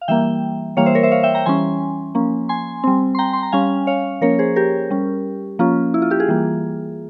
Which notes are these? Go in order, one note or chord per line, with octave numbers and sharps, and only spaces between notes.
F5
E3 G3 A#3 E5 G5
E3 G3 A#3 C#5 F5
C5 E5
A#4 C#5
C5 E5
C#5 F5
E5 G5
G5 A#5
E3 G3 C#4 G#5 C6
F3 A#3 C#4
G#5 C6
G3 C4
C6
G5 A#5
C6
A#5
G3 C#4 F5 G#5
C#5 F5
F3 A#3 C#4 A#4 C#5
G#4 C5
G4 A#4
G3 C#4
F3 A#3 C#4 F4
E4
F4
E4 G4
F4 G#4
E3 G3 A#3